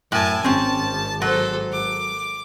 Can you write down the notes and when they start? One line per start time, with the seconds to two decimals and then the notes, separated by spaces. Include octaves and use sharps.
0.12 F#2 A2 G#5 A5
0.44 G#1 C4 C#4 A5
1.22 F#3 A4 C5
1.72 D6